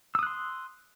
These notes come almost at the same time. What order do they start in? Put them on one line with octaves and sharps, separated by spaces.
E6 D#6 F#6 C6